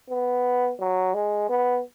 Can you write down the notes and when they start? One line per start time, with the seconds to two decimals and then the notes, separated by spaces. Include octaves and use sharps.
0.09 B3
0.80 F#3
1.14 G#3
1.49 B3